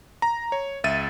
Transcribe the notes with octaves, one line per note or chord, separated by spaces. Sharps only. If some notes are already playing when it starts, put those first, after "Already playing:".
A#5
C#5
C#2 E5 A6 D#7